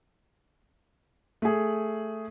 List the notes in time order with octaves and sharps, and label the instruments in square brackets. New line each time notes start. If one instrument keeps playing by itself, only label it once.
[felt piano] A3 G#4